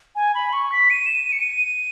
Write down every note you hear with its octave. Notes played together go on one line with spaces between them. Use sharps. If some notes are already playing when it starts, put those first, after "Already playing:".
G#5
B5
C#6
B6
D#7
E7
D#7
C#7
D#7